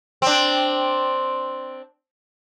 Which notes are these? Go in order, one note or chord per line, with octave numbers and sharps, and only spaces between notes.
C4 D4